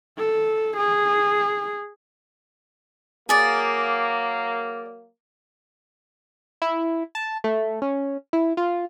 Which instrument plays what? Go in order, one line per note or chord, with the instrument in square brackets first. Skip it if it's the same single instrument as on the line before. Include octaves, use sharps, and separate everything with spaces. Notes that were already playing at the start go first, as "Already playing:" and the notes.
[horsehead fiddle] A4
G#4
[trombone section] F#3 A#3 [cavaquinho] G#4 D5
[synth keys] E4
A5
A3
C#4
E4
F4